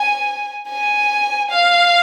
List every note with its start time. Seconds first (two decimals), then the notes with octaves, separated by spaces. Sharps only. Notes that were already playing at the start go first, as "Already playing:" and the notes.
Already playing: G#5
0.69 G#5
1.51 F5